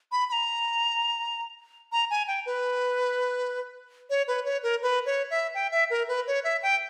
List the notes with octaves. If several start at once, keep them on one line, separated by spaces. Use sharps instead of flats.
B5
B5
A#5
A#5
G#5
G5
B4
C#5
B4
C#5
A#4
B4
C#5
E5
G5
E5
A#4
B4
C#5
E5
G5